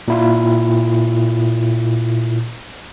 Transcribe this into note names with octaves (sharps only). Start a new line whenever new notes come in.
A#2 E4 F4